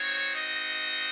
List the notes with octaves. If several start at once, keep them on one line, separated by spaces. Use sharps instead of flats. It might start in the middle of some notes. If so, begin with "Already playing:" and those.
Already playing: C4 D#4 F#4 C#5
D#5